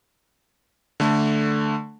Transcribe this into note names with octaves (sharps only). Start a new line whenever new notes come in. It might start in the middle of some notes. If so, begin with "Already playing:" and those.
D3 A3